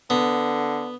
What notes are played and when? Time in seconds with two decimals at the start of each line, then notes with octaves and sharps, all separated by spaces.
0.10 D3 B3